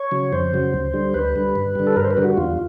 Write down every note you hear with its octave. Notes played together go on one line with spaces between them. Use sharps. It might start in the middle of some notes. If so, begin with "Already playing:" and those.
Already playing: C#5
C#3 F#3
F2 C5
C#3 F#3
D2
D3 G3
D2 B4
D3 G3
G2
D3 G3
A4
G2 A#4
C5
B4
D3 G3
F#4
E2 F4